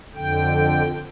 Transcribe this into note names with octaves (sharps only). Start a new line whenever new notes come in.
F2 D3 G5